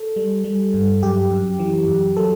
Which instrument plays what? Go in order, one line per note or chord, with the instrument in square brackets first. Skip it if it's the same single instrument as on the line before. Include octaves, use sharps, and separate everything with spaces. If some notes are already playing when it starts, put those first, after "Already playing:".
Already playing: [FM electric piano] A4
G3
G3
G2
F#2 G4
F#2
E3
F#2
F#3 A4